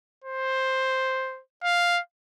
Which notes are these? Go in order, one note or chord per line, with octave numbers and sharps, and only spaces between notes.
C5
F5